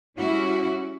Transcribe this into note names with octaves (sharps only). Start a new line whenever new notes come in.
G3 C#4 E4 F#4